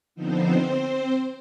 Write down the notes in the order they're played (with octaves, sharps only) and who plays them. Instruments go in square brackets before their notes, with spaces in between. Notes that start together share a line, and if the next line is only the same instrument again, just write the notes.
[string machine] D3 F3 B3 C4 D#4 C5